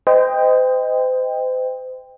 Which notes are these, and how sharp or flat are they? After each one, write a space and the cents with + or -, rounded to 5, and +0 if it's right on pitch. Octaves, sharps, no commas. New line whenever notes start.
C5 -35 D#5 +0 G5 +15